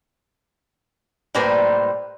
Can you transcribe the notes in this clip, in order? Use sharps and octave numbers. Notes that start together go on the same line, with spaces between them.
A2 G3 A#3 B4 C5